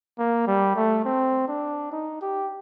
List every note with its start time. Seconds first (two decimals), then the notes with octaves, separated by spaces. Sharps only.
0.19 A#3
0.47 G3
0.76 A3
1.05 C4
1.48 D4
1.92 D#4
2.21 G4